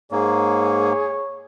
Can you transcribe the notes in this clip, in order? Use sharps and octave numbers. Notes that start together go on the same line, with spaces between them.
G#2 A#3 G#4 C#5